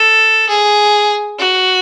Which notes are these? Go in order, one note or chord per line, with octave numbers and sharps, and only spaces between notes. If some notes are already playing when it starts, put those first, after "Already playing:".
Already playing: A4
G#4
F#4